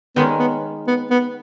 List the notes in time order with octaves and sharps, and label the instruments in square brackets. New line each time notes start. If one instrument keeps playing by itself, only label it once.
[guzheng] D#3 G#3 C#4 [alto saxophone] B3
[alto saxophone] B3
B3
B3